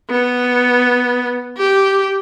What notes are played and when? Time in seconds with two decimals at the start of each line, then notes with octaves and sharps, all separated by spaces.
0.10 B3
1.57 G4